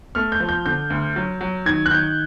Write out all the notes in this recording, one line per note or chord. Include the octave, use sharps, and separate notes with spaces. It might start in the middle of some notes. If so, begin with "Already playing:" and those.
A3 F6
G6
F3
G6
D3 G6
D2
F#3
F#3
D#3 G#6
F#6
D#3 G6